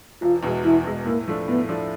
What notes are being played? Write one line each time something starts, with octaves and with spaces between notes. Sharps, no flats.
E1 F4
E2 B2 G#3
E1 E4
E2 B2 G#3
A2 A#3
F3 A3 D4
A2 B3
F3 A3 D4